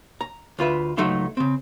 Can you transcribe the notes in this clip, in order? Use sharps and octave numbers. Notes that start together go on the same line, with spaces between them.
A#5
D2 F4 B4 E5
C#2 F#3 A3 D#4 E5 C6
C#3 C4